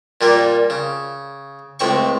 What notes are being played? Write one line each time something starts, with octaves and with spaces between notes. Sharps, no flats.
A#2 G3 A#3
C#3
C#2 A2 C4 C#6